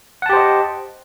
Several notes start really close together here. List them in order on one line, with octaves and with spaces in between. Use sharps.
F#5 A5 G4 C5 D#5